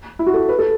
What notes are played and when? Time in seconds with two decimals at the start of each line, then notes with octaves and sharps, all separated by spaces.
0.19 E4
0.27 F#4
0.34 A4
0.49 B4
0.59 A4